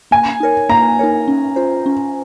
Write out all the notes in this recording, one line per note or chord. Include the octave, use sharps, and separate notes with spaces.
A#3 G#5
D#4 A#4 C#5
A#3 A#5
D#4 A#4 C#5
C#4
F4 C5
C#4